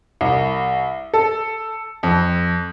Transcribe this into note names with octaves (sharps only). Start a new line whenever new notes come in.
C2
A4
F2